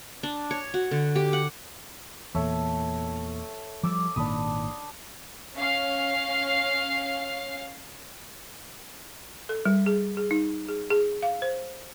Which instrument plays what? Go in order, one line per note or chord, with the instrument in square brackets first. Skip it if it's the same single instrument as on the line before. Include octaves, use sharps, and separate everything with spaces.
[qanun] D4
C#5
F#4
D3
G4
F#5
[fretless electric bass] E2 A#2 [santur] A4 C#5 E5
[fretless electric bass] F3 G3 [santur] D6 E6
[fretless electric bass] G#1 A#2 D#3 [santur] D4 B5 D#6
[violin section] C#4 F5
[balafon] A4
G3
G#4
G#4
D#4
G#4
G#4
F5
C5